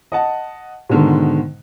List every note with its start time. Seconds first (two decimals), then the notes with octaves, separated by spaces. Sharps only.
0.12 D#5 F#5 A5
0.89 G#2 B2 D3 D#3 G#3